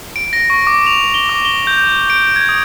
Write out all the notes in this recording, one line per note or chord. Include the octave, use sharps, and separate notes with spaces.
D7
A#6
C#6
D6
F7
G7
D6
G7
G6
D7
G#6
D#6